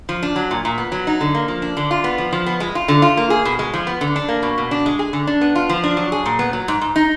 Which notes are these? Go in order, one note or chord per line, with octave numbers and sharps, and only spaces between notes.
F3
D4
F#3
A#2
A#2
B3
F#3
D#4
D3
A#3
F3
D4
D3
F4
B3
F3
F3
B3
G#3
F4
D3
F4
A#3
G#4
B2
G#3
F3
B3
D3
D4
A#3
B2
B2
D4
G#3
G#4
D3
D4
B3
F4
F3
D4
F#3
G#4
A#2
B3
F#3
G#2
G#2
D#4